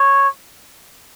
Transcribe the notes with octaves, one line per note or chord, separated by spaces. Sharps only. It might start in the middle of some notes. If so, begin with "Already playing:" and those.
Already playing: C#5